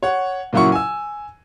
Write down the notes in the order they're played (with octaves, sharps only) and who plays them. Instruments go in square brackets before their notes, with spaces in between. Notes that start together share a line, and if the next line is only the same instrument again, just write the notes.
[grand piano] C#5 F#5
A#2 C#3 F#3 E4 F#5 C#6
G#5 E6